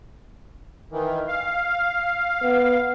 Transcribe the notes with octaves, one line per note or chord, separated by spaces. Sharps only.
D#3 E3
F5
B3